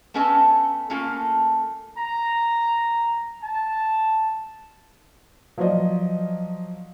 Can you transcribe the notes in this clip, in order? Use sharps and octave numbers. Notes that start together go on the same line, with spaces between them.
A3 B3 C#4 A4 D#5 A5
A3 A#3 C#4 F4 A4
A#5
A5
F3 F#3 C5 D5 D#5